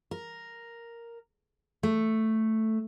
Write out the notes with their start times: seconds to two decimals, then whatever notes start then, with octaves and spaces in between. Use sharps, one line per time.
0.11 A#4
1.83 A3